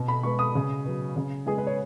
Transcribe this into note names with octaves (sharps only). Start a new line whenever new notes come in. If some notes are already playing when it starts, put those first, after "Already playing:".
Already playing: B2
B5
G#3 B3 C#6
D#6
C#3
F#3 B3
C#3
G#3 B3 G#4
B4
C#5